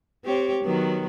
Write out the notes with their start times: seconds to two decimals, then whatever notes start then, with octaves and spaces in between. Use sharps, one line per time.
0.25 C4 G4 C#5
0.64 D#3 F#3 B3